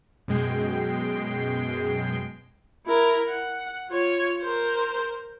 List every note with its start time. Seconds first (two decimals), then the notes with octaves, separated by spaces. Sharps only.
0.28 F#2 B2 G#3 G5 C7
2.86 E4 A#4
3.28 F#5
3.89 F4 C#5
4.41 A#4 C5